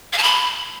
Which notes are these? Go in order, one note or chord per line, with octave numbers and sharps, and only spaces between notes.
F5
A5
B5